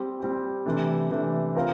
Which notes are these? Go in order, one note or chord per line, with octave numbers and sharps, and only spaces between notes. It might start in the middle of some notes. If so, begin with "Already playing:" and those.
Already playing: G3 C4 G4
G3 C4 G4
C3 E3 A3 D4
C3 E3 A3 D4
C4 F4 A#4 F5